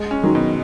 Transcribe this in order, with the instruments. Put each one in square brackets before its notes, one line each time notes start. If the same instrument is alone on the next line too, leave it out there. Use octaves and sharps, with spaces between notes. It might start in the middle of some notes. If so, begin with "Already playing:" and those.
Already playing: [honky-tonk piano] G#3
C#4
[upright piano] D#3 F#3
[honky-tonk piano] B2